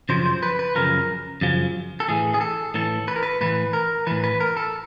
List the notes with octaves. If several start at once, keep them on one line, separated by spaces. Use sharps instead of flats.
F#2 C#3 F3 C5
C5
B4
B4
F#2 C#3 F3 A#4
F#2 C#3 F3
A4
A2 E3 G#4
G#4
A4
A2 E3 A4
B4
A#4
B4
A2 E3 B4
A#4
A2 E3 B4
B4
A#4
A4